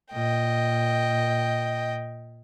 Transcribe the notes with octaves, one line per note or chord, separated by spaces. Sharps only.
A#2 D#5 G5